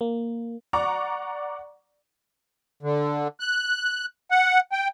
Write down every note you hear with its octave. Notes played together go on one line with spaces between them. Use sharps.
A#3
D5 F#5 A#5 C#6 D6
D3
F#6
F#5
G5